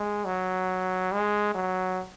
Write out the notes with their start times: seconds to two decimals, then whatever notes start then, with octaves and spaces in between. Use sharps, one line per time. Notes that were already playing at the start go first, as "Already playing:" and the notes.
Already playing: G#3
0.25 F#3
1.12 G#3
1.55 F#3